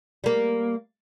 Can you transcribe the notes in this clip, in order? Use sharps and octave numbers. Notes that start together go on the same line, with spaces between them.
G3 A#3